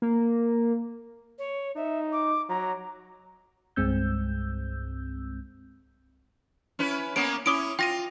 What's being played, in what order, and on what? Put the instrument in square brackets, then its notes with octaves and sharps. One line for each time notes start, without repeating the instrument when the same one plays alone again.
[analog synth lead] A#3
[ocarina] C#5
[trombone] D#4 [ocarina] E5
[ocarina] D6
[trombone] F#3 [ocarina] A#5
[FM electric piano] C2 G2 G#3 C4 E6 G6
[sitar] C#4 E4 B4
[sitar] A#3 B3 C#4 [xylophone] D7
[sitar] C#4 E4 [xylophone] D6 D#6 D7
[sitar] F4 [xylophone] G5 A#6 D#7